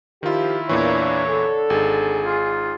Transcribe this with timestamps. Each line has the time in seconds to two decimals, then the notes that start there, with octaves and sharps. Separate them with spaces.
0.23 D#3 F3 E4 F4 G4
0.69 E2 A#2 E3 A#3 D4 C#5
1.27 D3 D4 A4
1.70 G#1 D#4 G#4
2.23 F4